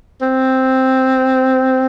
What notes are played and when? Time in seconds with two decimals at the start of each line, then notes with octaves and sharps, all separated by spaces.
0.22 C4